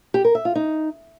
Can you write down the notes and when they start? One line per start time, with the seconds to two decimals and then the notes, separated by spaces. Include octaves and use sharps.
0.14 G4
0.24 A#4
0.35 E5
0.45 F4
0.55 D#4